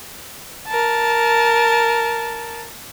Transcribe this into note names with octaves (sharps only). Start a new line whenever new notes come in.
A#4 A5